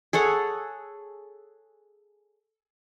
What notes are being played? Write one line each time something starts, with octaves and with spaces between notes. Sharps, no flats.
G#4 A4 C#5 F#5